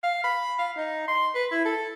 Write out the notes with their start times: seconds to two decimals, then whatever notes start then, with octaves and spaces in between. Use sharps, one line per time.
0.03 F5
0.24 B5
0.58 F5
0.76 D#4
1.08 C6
1.35 B4
1.51 E4
1.65 A4